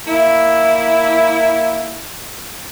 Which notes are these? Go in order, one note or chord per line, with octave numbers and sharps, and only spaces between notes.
A#3 E4